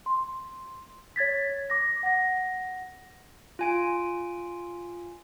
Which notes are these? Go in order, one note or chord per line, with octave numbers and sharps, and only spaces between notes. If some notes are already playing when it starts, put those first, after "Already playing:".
C6
C#5 G#6 A6 B6
D6 A#6
F#5 A#6
F4 G#5 D7